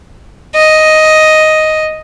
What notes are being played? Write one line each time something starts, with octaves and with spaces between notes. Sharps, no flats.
D#5